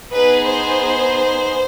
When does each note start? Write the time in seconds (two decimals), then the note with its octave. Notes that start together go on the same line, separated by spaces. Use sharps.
0.12 B3 D#4 G#4 B4
0.47 C5